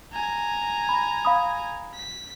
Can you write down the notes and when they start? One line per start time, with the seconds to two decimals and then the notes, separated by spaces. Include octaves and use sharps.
0.12 G#5 A#5
0.89 B5
1.25 F5 B5 D#6
1.94 B6